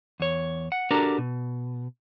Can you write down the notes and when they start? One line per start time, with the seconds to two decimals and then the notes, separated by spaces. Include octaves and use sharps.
0.20 E2 C#5
0.72 F#5
0.91 D4 F#4 G4 A4 A#4 A#5
1.18 B2